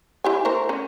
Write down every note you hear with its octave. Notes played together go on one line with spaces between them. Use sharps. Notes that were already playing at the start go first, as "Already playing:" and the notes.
E4 G4 G#5
A3 A#4 C5
C#4